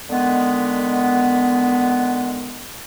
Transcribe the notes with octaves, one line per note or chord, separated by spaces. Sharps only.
D3 D#3 G#3 B3